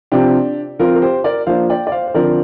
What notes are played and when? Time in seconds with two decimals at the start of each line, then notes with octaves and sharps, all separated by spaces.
0.12 C3 F3 C4 D4 G4
0.79 F3 C4 F4 A#4
0.95 A#4
1.02 G4 C5
1.24 A#4 D5
1.47 F3 A#3 D4 C5 F5
1.70 D5 G5
1.87 D5
1.92 C5 F5
2.07 C5
2.14 D3 F3 C4 A#4 D5